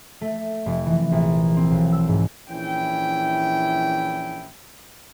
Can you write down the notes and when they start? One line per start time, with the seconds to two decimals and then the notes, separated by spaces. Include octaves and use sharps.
0.21 A3
0.66 F1
0.86 E3
1.12 A#1
1.57 C4
1.70 B1
1.92 E6
2.08 G#2
2.50 A#1 E3 C#4 E4 G5